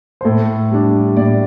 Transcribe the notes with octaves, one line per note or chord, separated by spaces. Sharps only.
C5
A2 A4
G3 D4
A2 D5